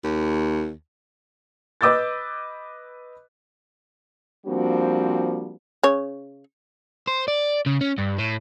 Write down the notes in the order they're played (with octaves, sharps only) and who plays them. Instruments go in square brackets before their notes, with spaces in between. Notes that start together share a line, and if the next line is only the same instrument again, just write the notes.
[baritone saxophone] D#2
[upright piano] B4 D#5 D6 E6 G6 A6
[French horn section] F3 G3 A#3 C4 D4 F#4
[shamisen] C#3 C#5
[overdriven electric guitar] C5
D5
C#3
C#4
G2
A2